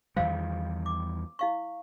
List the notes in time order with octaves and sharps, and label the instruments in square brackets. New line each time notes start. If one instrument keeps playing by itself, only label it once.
[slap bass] E2 D#3 G3 [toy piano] C5 F5
[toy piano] D6
E4 F5 C#6